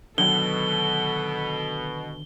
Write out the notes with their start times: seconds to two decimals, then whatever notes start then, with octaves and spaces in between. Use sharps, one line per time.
0.18 B2 D3 D#3 F#3 A4 G7